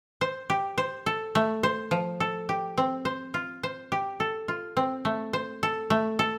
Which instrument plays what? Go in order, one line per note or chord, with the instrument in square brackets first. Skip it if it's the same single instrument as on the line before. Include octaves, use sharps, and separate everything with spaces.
[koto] C5
G4
C5
A4
A3
C5
F3
A4
G4
C4
C5
F4
C5
G4
A4
F4
C4
A3
C5
A4
A3
A4